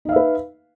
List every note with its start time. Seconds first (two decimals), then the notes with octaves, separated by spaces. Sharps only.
0.05 D#4
0.09 F5
0.12 E5
0.16 B4